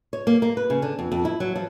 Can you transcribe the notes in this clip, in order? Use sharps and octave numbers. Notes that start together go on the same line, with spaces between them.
C#5
A#3
A#3
B4
C#3
D3
F2
F2
E4
F#3
F3